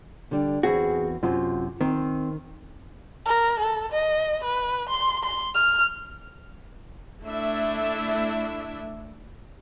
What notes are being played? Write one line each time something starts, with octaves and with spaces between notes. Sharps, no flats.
D3 G3
E2 C4 F#4 G#4
F#2 C3 F4
D#3 C4
A#4
A4
D#5
B4
C6
C6
F6
A3 D4 E4 E5